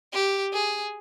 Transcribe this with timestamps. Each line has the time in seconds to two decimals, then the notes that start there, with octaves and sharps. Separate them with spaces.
0.13 G4
0.53 G#4